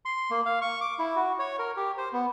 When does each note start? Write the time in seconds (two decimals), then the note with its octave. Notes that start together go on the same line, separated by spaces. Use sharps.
0.05 C6
0.30 A#3
0.46 F5
0.61 C#6
0.81 D6
0.99 E4
1.16 F#4
1.39 C#5
1.59 A#4
1.76 G4
1.98 C5
2.13 B3